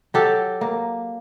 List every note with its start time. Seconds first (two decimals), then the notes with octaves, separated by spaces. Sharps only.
0.14 F#3 G4 A4
0.61 A#3